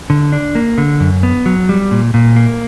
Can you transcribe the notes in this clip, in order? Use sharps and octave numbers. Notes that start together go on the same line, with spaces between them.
D3
D4
A#3
D3
F#2
B3
F#3
G3
A#2
A#2
A#3